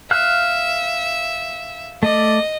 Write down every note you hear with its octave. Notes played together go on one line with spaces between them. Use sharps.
E5 F5 F6 F#6
A3 D5 D#5